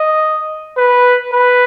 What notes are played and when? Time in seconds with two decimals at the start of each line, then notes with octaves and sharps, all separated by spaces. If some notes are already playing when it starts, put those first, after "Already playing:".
Already playing: D#5
0.77 B4
1.32 B4